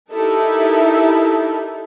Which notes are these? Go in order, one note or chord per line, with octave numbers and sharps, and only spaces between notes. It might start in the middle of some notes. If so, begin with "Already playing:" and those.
D#4 E4 G4 A4 A#4